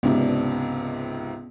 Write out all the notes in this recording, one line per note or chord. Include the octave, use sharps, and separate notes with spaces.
C#2 G#2 C3 B3 C#4 D4